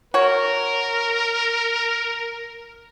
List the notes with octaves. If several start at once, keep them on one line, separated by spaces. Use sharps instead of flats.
F#4 A#4 C#5